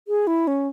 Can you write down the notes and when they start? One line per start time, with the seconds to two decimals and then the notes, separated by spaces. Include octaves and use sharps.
0.08 G#4
0.27 E4
0.47 C#4